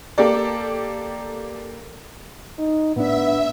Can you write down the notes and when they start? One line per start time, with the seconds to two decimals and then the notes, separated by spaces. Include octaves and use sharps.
0.18 A#3 G4 A4 D5
2.58 D#4
2.96 A2 B3 D4 E5